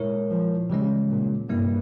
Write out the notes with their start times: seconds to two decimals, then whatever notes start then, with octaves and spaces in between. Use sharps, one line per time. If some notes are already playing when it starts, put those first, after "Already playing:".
Already playing: A#2 G#3 E4 A#4 C#5
0.30 F3
0.70 C#3 E3 G3 G#3 C#4
1.09 A#2
1.49 G2 C3 G3 A#3 E4